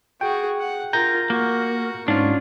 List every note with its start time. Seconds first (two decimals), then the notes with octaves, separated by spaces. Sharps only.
0.21 F#4 G#4 G5
0.60 F#5
0.93 F4 A#4 A#5 G6 A#6
1.30 A#3 F#4
2.08 G#2 C#4 D4 F4